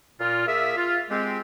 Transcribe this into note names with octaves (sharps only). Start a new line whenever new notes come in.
A#2 F4
A#3 G#4 A#4 E5
F4
G#3 C4 G4